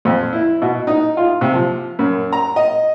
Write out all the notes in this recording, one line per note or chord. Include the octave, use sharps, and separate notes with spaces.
F2
E4
B2
D#4
F4
C3
F3
F#2
A#5
D#5